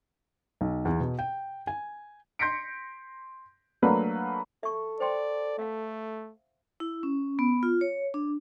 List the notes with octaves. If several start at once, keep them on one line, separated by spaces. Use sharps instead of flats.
B1
E2
B2
G5
G#5
C6 G6 A#6 B6 C#7 D7
F#3 A3 A#3 D4 F#4 B4
A4 E5 C#6
C5 D5 G5 C6
A3 E5 F5
E4
C#4
B3
F4
C#5
D4